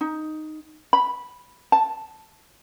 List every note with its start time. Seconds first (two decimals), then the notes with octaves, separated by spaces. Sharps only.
0.01 D#4
0.93 B5
1.72 A5